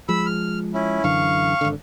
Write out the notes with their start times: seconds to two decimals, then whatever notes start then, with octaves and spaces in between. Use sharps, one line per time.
0.09 F3 G#3 B5 E6
0.26 F6
0.74 C#4 E4
1.04 F#2 D3 E3 F5 C#6
1.61 G#1 D3